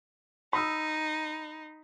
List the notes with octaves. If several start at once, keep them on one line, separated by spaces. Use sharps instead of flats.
D#4 B5 D#6 E6